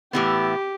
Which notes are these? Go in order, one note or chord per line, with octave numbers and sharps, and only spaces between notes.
A2 E3 B3 G4